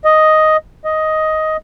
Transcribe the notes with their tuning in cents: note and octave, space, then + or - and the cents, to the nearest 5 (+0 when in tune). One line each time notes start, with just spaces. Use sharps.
D#5 +5
D#5 +10